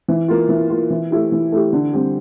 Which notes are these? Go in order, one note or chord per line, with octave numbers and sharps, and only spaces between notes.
E3
A#3 F4
E3
A#3 F4
E3
A3 E4 G4
E3
A3 E4 G4
D3
G3 C4 G4